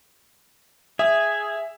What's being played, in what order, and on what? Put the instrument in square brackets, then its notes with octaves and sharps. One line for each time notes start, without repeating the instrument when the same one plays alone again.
[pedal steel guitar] G#4 [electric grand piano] E5